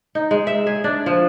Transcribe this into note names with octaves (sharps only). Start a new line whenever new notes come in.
D#4
G#3
E5
G#4
D4
F3